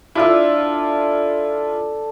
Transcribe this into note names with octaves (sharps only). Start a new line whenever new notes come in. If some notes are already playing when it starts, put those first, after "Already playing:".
D4 E4 F4 A4